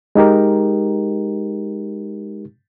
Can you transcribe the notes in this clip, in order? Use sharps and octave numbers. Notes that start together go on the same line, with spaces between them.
G#3 D#4 G4 A#4